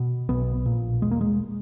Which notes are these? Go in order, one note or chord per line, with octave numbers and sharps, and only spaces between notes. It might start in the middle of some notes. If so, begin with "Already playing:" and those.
Already playing: B2
B1 B2 B3
A#1 A#2
E1 E2 B2 G#3
A#3
G#3